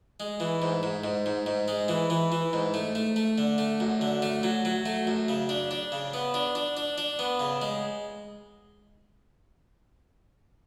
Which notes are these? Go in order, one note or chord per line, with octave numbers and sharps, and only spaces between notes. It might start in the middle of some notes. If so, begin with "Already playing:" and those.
G#3
E3
G#2
G#2
G#2
G#2
G#2
G#3
E3
E3
E3
G#2
A3
A3
A3
D3
A3
F#2
D3
A3
F#3
F#3
A3
F#2
C#3
D4
D4
C#3
B3
D4
D4
D4
D4
B3
C#3
G#3